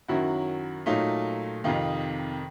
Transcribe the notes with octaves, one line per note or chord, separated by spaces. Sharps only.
F#2 D#3 F#3 E4 F#4
A#2 F#3 A3 D#4 F4
F2 C3 D#3 D#4 F4